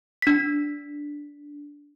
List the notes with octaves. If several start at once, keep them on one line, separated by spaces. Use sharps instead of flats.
D4 B6